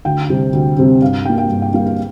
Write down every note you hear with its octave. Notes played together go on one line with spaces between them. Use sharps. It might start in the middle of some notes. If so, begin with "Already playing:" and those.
D2 G5
C3 G3 C4
D2
C3 G3 C4
G2 F5
G3 A#3 G5
G5
G2
G5
G3 A#3 F5
F5